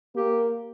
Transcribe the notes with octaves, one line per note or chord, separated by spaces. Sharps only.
A#3 G4